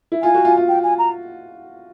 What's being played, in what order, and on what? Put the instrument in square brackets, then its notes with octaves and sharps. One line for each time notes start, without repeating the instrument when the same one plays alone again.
[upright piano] E4
[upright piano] F4 [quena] G#5
[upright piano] F#4
F4
F4
[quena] G5
G#5
A#5